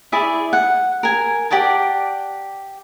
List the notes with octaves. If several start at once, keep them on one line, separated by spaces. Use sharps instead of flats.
E4 G#4 D5 E5
F#5
A#4 G#5
G4 D5 F#5 A5